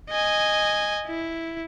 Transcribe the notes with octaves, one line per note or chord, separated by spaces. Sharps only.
D#5 G#5
E4